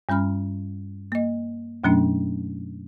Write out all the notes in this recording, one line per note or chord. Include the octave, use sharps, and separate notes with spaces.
G2 G3 C#4 B5 F6
A#3 D#5
F#2 B2 F#3 A3 C#4 D4